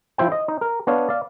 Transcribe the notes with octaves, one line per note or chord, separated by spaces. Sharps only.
F3 E4 C5 G5
D#5
D#4
A#4
B3 D4 C#5 F5
D5 F5